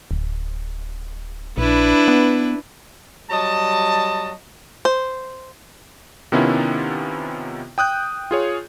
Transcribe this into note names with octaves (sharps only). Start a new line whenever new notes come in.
D1
A#1 D4 E4 B4
B3
F#3 G3 D#5 A5
C5
C3 D#3 B3 C#4 E4 F4
G5 D#6 F#6 G6
F4 G#4 C#5